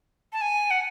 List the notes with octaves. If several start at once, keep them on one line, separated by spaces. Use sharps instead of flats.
A5
G#5
F#5